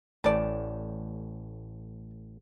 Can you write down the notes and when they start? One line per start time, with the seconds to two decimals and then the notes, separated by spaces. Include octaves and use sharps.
0.24 A1 A2 D5 A5